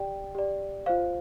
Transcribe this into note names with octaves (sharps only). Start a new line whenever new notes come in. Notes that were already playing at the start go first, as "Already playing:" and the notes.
Already playing: G4 D5 G5
G4 D5
F4 C5 F5